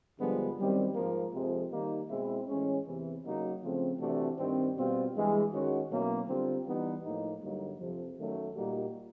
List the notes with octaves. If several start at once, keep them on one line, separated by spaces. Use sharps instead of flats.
G2 D3 F3 G#3 B3
F#2 D#3 G3 C4
G#2 F3 A#3
F2 C3 F3 G#3 C4
D#3 G3 A#3 D#4
B2 G#3 C4 E4
A2 E3 G#3 C#4
E2 C3 E3
C#3 F#3 A#3 D#4 F#4
C#3 F3 A3 C4
C3 E3 A3 D4 F#4
G2 D#3 G3 C4
B2 G3 C4 F4
G2 E3 G#3
D#3 G#3 C#4 F#4
B2 F#3 A#3 C#4 E4
D3 G3 C4 F4
E3 G3 B3 D#4
A2 F3 A#3 D#4
G2 D3 F#3 A#3 D#4
F2 C3 F3
F#2 D#3 F#3 A3
A#2 G3 A#3 D#4 F#4